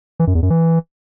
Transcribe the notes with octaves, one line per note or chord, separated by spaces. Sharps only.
E3
F#2
E2
F#2
E3